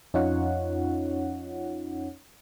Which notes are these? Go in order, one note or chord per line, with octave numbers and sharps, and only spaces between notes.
F2 C#4 D#4 F4 C#5 F#5